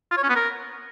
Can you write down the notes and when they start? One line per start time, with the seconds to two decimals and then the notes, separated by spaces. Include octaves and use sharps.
0.11 F4
0.17 C#5
0.23 C#4
0.29 B3
0.35 A#4